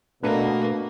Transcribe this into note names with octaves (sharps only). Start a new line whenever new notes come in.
B2 A3 A#3 D4 B4